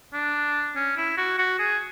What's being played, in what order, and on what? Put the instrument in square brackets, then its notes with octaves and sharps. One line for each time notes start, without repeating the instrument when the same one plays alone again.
[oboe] D4
C#4
E4
F#4
F#4
G#4